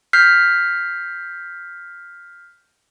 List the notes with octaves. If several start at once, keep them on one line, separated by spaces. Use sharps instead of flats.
F6 G6 B6 C7